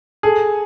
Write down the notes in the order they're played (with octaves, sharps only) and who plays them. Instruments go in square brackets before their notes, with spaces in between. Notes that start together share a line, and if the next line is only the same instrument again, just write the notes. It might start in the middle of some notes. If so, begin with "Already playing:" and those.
[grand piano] G#4 [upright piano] A4